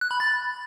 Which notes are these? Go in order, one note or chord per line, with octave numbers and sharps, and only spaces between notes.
F#6
B5
A6